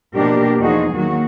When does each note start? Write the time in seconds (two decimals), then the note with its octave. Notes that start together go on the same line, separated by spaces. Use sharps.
0.16 B2 F3 A#3 D4 G4 A#4
0.60 E2 F3 D#4 F#4 G#4
0.94 D#3 F#3 A#3 F#4